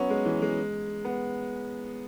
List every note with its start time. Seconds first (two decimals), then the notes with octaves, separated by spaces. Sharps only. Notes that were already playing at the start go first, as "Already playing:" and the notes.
Already playing: F#3 B3 C#4
0.10 G#3
0.25 E3
0.42 G#3
1.05 B3